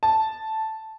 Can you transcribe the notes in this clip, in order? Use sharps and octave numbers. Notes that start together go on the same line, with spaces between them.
A5